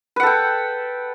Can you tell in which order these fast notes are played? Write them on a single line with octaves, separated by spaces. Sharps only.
B4 F#5 A4 G5